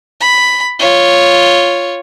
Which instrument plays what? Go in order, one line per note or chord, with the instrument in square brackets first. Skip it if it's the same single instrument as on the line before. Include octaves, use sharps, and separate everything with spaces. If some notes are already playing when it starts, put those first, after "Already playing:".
[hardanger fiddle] B5
F4 C#5